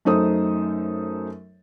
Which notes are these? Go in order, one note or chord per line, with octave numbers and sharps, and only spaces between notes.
F#2 A3 D#4 A4 C5 D#6